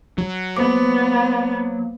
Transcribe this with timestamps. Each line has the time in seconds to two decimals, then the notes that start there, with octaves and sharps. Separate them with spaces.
0.18 F#3
0.57 A#3 B3 C5 D6